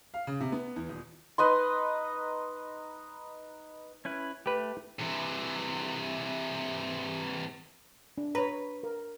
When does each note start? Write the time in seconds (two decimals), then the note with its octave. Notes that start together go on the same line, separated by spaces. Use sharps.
0.14 F5
0.27 C#3
0.40 C3
0.52 B3
0.76 E2
0.89 D#1
1.38 D#4 B4 D#5 C6
4.05 C#4 E4 B4
4.46 A3 G4 B4
4.99 C3 E3
8.18 D4
8.35 B4 C#5 A#5
8.83 A#4